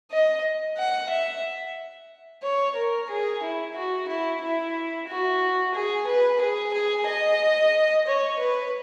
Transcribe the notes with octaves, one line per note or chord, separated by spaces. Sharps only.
D#5
F#5
E5
C#5
A#4
G#4
E4
F#4
E4
E4
F#4
G#4
B4
G#4
G#4
D#5
C#5
B4